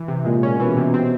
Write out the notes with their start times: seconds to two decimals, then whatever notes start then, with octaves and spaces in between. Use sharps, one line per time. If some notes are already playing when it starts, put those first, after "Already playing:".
Already playing: E3
0.08 C3
0.25 A#2 G#3
0.43 C#4
0.60 B2 E3
0.77 C3
0.94 C4